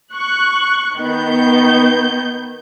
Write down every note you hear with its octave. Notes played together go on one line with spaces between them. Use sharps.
C#6 F#6
D#3 B3 G6